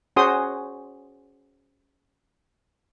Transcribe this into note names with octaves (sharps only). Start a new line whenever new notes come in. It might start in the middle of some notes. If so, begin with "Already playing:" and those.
C#4 F#4 G#4 C5 C6 D#6